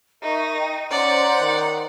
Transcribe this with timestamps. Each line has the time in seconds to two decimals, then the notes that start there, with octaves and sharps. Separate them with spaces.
0.23 D#4 A#4 E5 C#6
0.58 G5
0.91 C#4 C5 D5 F#5 A#5 C6
1.41 D#3